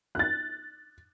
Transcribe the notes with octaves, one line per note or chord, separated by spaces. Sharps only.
F#6 A6